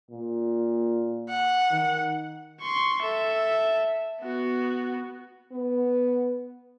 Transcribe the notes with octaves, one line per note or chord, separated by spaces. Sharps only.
A#2
F#5
D#3
C6 C#6
A4 E5
B3 F#4
B3